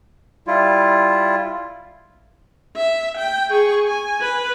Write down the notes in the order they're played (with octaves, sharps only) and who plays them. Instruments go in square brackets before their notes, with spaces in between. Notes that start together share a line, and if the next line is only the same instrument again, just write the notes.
[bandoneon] G3 E4 F4
[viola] E5
G5
G#4 C#6
G#5
B4